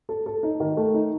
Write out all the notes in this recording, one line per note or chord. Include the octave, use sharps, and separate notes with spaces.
A4
A4
D#4
D#3
A3
D#4